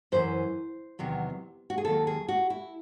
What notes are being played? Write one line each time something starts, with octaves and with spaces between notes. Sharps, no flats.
F#2 E3 C5
E2 C3 D#3 F#3
F#4
G#4
D#2 D#3 F#3 A4
G#4
F#4
E4